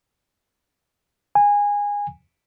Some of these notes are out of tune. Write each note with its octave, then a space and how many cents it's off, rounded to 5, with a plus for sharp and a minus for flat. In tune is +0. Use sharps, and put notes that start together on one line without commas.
G#5 -20